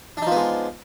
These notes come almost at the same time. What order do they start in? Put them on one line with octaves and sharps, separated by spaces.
D4 D#4 F3 B3 G#3